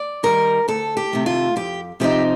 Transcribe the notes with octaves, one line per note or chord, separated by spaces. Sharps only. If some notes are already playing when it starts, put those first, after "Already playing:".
Already playing: D5
D#3 G3 A#4
D2 A4
G4
C3 D#3 A3
F4
F2 G4
C3 F3 C4 D#4 G4